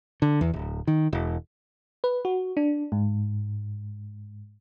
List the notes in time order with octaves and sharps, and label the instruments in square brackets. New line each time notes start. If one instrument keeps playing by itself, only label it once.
[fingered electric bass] D3
E2
D1
D#3
E1
[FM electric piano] B4
F#4
D4
G#2